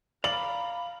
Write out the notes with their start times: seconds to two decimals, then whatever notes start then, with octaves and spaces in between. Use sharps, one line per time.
0.24 D5 F5 A#5 B5 F#7